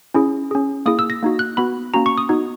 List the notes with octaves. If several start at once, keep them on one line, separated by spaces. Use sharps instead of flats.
C#4 E4 G#4
C#4 G#4
A#3 E4 G#4 D#6
E6
A#6
A#3 D#4 F#4
F#6
B3 F#4 B5
A#3 C#4 F#4 A#5
C#6
D#6
B3 D#4 F#4